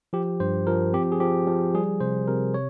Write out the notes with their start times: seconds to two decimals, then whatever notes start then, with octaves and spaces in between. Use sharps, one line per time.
0.13 F3 G4
0.40 G2 C5
0.67 F3 A#4
0.93 C4 G4
1.12 G#4
1.20 F3 G4
1.48 F3
1.74 G3 G#4
2.01 C3 C5
2.28 C3 A#4
2.54 C#5